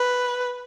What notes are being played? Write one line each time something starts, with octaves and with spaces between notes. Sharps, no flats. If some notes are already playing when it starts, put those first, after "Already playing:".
Already playing: B4